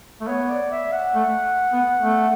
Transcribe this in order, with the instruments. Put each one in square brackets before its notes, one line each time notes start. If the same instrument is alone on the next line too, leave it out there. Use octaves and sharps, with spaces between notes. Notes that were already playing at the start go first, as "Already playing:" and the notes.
[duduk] A3
[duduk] B3 [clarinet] C#5
[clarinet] D5
E5
F#5
[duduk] A3
B3
A3